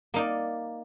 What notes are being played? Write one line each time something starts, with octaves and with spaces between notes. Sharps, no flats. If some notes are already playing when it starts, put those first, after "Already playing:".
A#3 D#4 D5